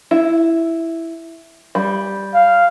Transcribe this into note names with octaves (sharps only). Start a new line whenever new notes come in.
E4
G3
F5